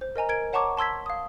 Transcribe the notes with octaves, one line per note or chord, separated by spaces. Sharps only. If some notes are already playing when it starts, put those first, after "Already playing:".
C5
A#4 D#5 G#5 A#5
A#4 G#6 D7
C#5 F#5 A5 A#5 C#6 D6
A5 C6 E6 G#6 B6
F5 D#6